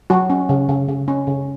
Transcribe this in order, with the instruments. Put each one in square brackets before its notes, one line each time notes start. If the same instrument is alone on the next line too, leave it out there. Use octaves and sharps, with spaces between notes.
[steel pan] F#3 F#4
C#4
C#3
C#3
C#3
C#4
C#3